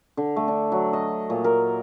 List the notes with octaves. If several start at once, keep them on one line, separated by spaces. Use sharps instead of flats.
D3
A3
D4
F#3
D#5
A#2
A#4